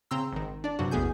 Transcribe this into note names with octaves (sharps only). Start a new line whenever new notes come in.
C#3 C4 A#5 C6 E6
G#1 D#3
D4 D5
G2 C3 F#3 F#4
A1 E2 B3 G#4 G#5 G6